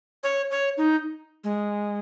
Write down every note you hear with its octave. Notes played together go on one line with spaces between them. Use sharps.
C#5
C#5
D#4
G#3